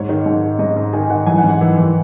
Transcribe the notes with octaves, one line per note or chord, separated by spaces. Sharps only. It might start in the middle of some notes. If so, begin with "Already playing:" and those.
Already playing: G#2 C#5
D#3
G#2
D#3
G#2 D#5
G#2
D#3 G#5
D#3 F#5
E3 G#5
F#5
G#2
F#5
E3
E3